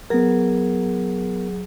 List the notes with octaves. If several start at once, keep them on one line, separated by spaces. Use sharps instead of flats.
F#3 B3 G#4 A#4